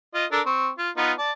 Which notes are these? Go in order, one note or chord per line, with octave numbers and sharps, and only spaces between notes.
F4 D#5
D4 A4 A#4
C4 C#6
F4
B3 D#4 F4
D5 A5